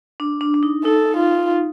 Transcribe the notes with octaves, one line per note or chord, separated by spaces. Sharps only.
D4
D4
D4
D#4
D#4 A4
F4